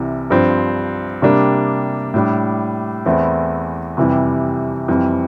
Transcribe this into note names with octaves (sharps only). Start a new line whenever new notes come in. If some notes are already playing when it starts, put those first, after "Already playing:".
Already playing: C2 C3 E3
G2 F3 C4
C3 G3 A#3 D4
A2 G3 D4
E2 E3 A3 C4 E4
F2 C3 E3 G3
F2 E3 G3 C4